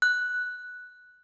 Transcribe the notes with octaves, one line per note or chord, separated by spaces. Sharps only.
F#6